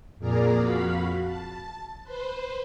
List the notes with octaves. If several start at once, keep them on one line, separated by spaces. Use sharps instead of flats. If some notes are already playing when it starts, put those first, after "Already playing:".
F2 A#2 G#4 A#4 D5 A#5
F2 F#4 F5 B5 B6
A5
B4 C5